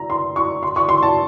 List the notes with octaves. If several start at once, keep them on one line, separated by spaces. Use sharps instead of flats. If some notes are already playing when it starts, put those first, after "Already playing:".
Already playing: A#5
C6
C#6
C6
C#6
C6
A5